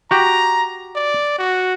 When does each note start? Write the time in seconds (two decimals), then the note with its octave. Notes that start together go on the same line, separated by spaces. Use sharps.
0.11 F#4 G4 A#5
0.95 D5
1.38 F#4